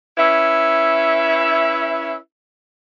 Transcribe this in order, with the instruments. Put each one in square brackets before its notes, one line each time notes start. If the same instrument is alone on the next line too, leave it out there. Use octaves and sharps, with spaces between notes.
[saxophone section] C#4 E4 B4 E5